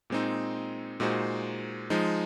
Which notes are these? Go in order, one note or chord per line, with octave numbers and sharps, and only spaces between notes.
A#2 G#3 C4 D#4
A#2 G#3 D#4 F#4 C5
F3 G#3 D#4